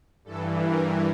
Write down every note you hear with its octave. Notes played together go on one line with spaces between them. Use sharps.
G2 E3 A4
A#4